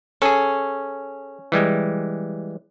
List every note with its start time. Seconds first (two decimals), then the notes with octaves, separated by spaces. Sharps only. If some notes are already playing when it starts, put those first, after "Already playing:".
0.22 C#4 G#4 A4
1.52 E3 G3 G#3